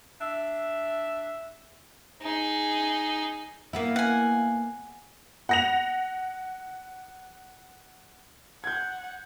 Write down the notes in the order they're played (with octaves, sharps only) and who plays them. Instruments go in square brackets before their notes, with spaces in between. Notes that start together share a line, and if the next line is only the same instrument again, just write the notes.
[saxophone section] D4 E5
[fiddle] D#4 G#4
[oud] A#3 B3 E4
[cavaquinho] F#5 G#5
[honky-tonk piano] F#5 A#6 F7
[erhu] F#5 [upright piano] G6 G#6